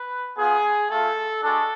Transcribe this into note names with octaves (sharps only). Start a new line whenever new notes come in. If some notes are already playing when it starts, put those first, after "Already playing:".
Already playing: B4
B3 F4 G#4
A3 F4 A4
G#3 D4 F#4 A4